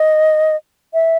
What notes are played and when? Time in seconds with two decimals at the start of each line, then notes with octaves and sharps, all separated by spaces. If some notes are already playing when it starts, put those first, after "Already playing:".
Already playing: D#5
0.94 E5